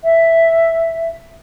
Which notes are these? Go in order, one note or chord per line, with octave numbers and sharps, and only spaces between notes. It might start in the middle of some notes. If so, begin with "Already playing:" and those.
E5